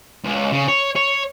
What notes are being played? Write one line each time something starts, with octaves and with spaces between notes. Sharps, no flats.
C#2
C#3
C#5
C#5